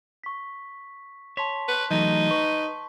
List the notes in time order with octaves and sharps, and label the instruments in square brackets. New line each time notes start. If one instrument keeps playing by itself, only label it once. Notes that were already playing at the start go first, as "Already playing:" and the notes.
[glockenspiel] C#6 B6
[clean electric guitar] C#5 [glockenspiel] A5 C6 B6
[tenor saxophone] B4
[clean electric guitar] E3 F#3 A3 [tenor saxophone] D#4
[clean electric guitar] B4 [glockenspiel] C#6